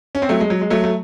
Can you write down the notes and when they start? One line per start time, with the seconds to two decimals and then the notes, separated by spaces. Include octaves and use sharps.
0.15 C#4
0.22 C4
0.29 F#3 A3
0.40 G#3
0.50 F#3
0.61 G#3
0.70 F#3 A3
0.84 A3